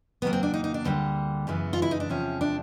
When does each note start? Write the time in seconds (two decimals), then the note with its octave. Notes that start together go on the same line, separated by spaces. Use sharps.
0.22 D#2 C#3 F#3 A#3 B3
0.33 C4
0.43 D4
0.54 D#4
0.64 D#4
0.74 D4
0.84 D2 D3 G3 A#3 C4
1.47 F#2 C#3 E3 G#3 B3
1.73 F4
1.82 E4
1.91 D#4
2.00 D4
2.09 E2 C3 F3 G#3 C#4
2.41 D4